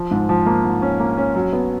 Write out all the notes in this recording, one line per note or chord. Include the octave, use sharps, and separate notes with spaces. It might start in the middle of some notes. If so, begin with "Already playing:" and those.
Already playing: F3
G#2
F3
A#3
G#2
C#4
A#3
C#4
F#3
B3